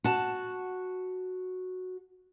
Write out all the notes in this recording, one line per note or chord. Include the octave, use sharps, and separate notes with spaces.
F#4 A5